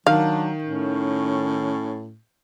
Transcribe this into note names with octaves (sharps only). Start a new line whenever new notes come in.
D#3 F#3 D4 F5
A2 C#4